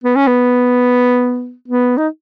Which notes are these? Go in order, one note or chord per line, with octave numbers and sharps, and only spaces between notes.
B3
C#4
B3
B3
D#4